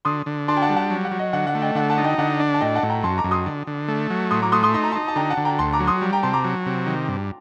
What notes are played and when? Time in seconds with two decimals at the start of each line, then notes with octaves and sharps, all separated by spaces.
0.05 D3 C6 D#6
0.26 D3
0.48 D4 A5 C6
0.57 G5
0.62 F#5 A5
0.69 G3
0.76 F#5 A5
0.90 F#3
1.05 F#5
1.12 F#3
1.19 D#5
1.33 D3 F#5
1.47 F#5
1.55 A3
1.62 D#5 G5
1.75 D3 F#5
1.90 F#5 A5
1.98 D#4
2.04 D#5 G5
2.18 D3 F#5
2.40 D4
2.54 A5
2.61 A2 D#5 G5
2.75 F#5 A5
2.83 A2
2.89 G5 A#5
3.03 F#2 A5 C6
3.18 A#5 D6
3.24 F#2
3.31 C6 D#6
3.46 D3
3.67 D3
3.88 A3
4.10 F#3
4.31 A2 C6 D#6
4.42 A#5 D6
4.52 A3 C6 D#6
4.63 C6 D#6
4.74 D#4 C6
4.84 A#5
4.92 D#4 A5 C6
5.08 A5
5.16 D3 G5 A#5
5.30 F#5 A5
5.37 D3
5.45 G5 A#5
5.59 D2 A5 C6
5.73 A#5 D6
5.80 F#3
5.87 C6 D#6
6.02 G3
6.13 G5 A#5
6.23 C3 A5 C6
6.33 A#5 D6
6.44 F#3
6.66 C3
6.86 D#3
7.08 G2